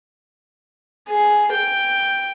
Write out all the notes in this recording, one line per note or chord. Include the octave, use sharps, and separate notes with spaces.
G#4
G5